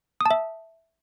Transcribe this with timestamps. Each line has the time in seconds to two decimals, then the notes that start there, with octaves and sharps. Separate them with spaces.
0.21 D#6
0.26 A5
0.31 E5